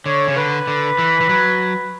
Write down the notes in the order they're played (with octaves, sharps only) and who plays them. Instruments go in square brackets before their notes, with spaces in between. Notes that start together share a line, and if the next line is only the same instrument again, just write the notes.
[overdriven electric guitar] D3 [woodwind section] C#5
[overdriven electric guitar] C#3 [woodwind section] C#5
[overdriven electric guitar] D3 [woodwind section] B4
[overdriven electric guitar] D3
E3
E3
F#3